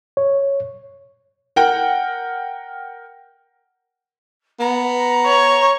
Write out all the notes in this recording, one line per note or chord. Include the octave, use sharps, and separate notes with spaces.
C#5
A#4 F#5 G5
B3 A#5
C#5